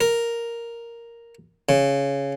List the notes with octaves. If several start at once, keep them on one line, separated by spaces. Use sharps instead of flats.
A#4
C#3